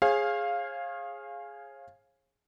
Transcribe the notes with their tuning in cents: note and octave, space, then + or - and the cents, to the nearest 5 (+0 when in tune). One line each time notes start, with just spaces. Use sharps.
G#4 +0 C#5 -40 F5 +0